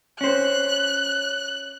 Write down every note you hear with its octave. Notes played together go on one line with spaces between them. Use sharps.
C#4 C5 F#6